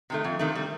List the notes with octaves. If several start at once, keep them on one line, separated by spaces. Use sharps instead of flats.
C3 D#3 A3
F2
C3 D#3 A3
G3